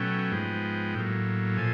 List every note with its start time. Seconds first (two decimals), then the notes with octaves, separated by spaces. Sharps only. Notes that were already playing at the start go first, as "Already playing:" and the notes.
Already playing: B2 F#3 A3 C#4 G5
0.32 G#2 F3 G#3 B3
0.95 A2 F#3 A#3
1.57 A#2 F3 A3 G#5